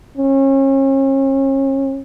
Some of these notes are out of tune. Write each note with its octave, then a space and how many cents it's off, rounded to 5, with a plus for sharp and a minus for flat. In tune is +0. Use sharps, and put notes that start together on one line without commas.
C#4 -35